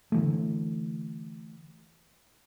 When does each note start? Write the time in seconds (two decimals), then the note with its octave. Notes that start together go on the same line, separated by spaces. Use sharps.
0.12 D3 E3 A3